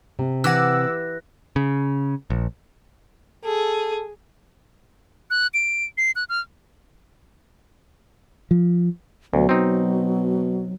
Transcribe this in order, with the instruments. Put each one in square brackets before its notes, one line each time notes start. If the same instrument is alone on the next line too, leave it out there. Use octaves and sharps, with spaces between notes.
[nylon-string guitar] C3
[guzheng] E3 [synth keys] F#5 D6 E6 [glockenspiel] F#6 A#6
[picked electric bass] C#3
A#1
[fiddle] G#4 [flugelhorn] A4
[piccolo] F#6
D7
C7
F#6
F6
[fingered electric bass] F3
[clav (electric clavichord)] D2 [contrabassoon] B2 [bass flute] F#3
[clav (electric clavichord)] C4 D#4